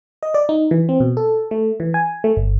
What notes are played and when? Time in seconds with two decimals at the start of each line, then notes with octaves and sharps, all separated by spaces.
0.23 D#5
0.34 D5
0.49 D#4
0.71 E3
0.89 C4
1.00 B2
1.17 A4
1.51 A3
1.80 E3
1.94 G#5
2.24 A3
2.37 G1